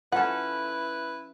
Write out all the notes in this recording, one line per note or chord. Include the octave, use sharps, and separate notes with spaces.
F3 C#4 E4 A4 B4 F#5